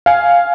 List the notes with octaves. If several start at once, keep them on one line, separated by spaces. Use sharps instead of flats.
F5 G#5